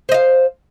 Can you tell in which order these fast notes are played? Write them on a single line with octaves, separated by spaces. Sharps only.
C5 D#5 F5